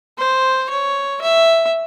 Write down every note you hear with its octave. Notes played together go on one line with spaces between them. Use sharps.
C5
C#5
E5